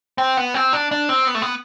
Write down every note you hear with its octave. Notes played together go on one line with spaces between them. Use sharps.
C4
B3
C4
D4
D4
C4
B3
A3
B3